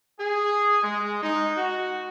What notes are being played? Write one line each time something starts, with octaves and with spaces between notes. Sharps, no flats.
G#4
G#3
D#4
F#4